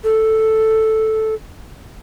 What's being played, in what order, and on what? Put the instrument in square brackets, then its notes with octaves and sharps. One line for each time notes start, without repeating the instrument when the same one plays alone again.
[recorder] A4